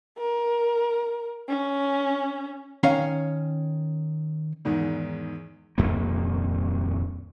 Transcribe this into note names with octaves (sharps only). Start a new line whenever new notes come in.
A#4
C#4
D#3 C#4 F5
E2 G#2 D#3
D#1 C2 F2 A#3